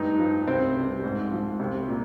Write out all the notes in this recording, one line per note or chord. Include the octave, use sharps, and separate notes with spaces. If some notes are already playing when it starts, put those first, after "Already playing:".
Already playing: G2 D#4
F3
C2 C4
C3 G3
G#2
F3
C2
A#2